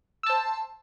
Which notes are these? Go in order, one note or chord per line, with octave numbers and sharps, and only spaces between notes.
C5 A5 E6